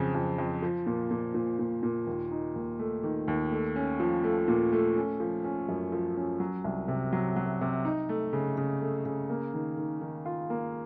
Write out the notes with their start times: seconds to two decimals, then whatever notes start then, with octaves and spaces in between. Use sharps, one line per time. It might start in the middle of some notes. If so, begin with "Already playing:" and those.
Already playing: F2 C#3 F#3 C4
0.15 F2
0.38 F2
0.62 F3
0.86 A#2
1.11 A#2
1.35 A#2
1.59 A#2
1.83 A#2
2.07 D#2
2.31 D#4
2.56 D#2
2.79 A3
3.03 D#3
3.28 D#2
3.52 A3
3.76 C#4
4.00 F3
4.24 A3
4.48 A#2
4.72 A3
4.96 C#4
5.20 F3
5.44 C#4
5.69 F#2
5.92 F3
6.17 C#4
6.40 F#3
6.64 C2
6.88 C3
7.12 F#3
7.36 F#3
7.61 C3
7.85 D#4
8.09 A3
8.33 C#3
8.57 C#3
8.81 A3
9.06 C#3
9.30 A#3
9.54 D#3
9.77 D#3
10.01 D#3
10.25 F4
10.50 A#3